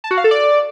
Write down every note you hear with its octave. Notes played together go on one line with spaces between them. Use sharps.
A5
F#4
F5
A4
D5